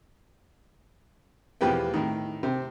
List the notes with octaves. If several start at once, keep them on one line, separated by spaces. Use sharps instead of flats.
E2 B2 F3 G4 B4 G5
A2 D#3
C3